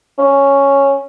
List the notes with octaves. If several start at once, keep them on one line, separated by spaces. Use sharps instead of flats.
C#4